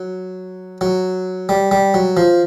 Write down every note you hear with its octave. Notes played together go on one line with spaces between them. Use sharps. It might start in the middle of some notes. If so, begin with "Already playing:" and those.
Already playing: F#3
F#3
G3
G3
F#3
F3